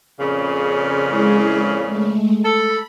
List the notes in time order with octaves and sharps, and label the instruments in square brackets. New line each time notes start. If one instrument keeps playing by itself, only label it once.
[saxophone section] F2 A#2 C#3
[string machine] G#3 E4 G#4
G#3 A3
[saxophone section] A4 [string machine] B5